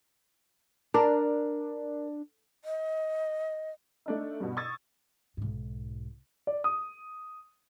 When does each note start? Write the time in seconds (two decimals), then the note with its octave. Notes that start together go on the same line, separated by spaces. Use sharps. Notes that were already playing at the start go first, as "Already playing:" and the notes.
0.94 D4 A#4
2.65 D#5
4.06 A3 D4 D#4
4.40 G2 B2
4.57 C#6 D#6 E6 G#6 A6
5.37 B1 G#2
6.47 D5
6.64 D#6